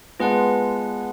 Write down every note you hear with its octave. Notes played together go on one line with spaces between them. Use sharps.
G#3 B3 F4 B4 F#5 A5